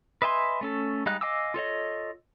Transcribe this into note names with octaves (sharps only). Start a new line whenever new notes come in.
B4 D#5 E5 G#5 C6
A3 C#4 A4
G3 G#3 D#4 F5 F#6
D#5 F5 G#5 D6 E6
F4 A4 C#5 D#5